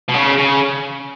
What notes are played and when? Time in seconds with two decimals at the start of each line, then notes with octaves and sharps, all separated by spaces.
0.09 B2
0.14 C#3
0.38 C#3